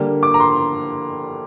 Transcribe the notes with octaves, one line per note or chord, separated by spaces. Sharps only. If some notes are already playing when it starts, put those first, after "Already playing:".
Already playing: D3 G3 A#3
D6
A#5
C6